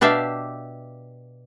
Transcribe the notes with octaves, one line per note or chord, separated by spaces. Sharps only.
B2 D4 G4 E5 F5